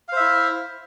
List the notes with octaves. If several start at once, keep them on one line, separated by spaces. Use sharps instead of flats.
E4 C5 E5 F5